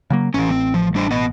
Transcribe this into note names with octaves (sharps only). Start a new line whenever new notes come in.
C#3 F#3 A#3
A1 E3 C#4
C4
F3
G3 D4 C5
B3 D#5